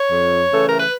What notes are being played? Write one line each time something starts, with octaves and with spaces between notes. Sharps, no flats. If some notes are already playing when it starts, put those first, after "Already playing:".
Already playing: C#5
F2
C#3 E3 A3 A4
A#4
B4